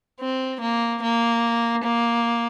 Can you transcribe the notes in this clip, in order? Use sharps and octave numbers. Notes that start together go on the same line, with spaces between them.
C4
A#3
A#3
A#3